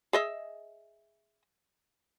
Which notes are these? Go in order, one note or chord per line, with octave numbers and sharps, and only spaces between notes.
G#4 D#5 E5